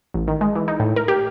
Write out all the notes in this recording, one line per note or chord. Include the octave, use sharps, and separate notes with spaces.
A1
D#3
G#3
E3
D#4
A2
A#4
G4